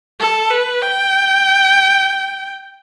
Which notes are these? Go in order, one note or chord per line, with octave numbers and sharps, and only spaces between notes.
A4
B4
G5